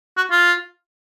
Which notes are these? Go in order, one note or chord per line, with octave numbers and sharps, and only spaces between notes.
F#4
F4